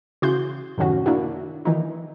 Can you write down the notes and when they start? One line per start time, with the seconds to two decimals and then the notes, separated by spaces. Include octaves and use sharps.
0.22 C#3 E3 F#4 C6 G6
0.78 F#2 A2 C3 D#3 C#4 F#4
1.06 A#3 D4 E4 F#4
1.65 D#3 E3 D#4